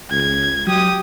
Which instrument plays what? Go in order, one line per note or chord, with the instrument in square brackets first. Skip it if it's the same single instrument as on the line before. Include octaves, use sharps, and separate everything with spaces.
[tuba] C#2 [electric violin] G#6
[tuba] F#3 [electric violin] G4 D#6